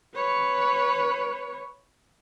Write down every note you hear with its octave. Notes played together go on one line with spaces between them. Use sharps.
B4 C#5